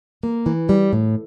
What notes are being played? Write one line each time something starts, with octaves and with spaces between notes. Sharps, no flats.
A#3
E3
G3
A2